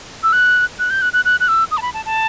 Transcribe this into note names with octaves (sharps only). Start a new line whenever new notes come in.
E6
F#6
F#6
G6
F#6
F#6
F#6
F#6
E6
D#6
A5
B5
A5
A5